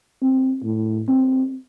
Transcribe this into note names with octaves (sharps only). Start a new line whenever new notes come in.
C4
A2
C4